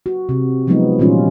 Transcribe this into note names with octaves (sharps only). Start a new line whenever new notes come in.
F#4
C3
F3 F#3 G#3 B3 D#4
A#2 E3 G3 C#4 F4